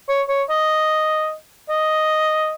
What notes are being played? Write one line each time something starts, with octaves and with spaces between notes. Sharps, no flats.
C#5
C#5
D#5
D#5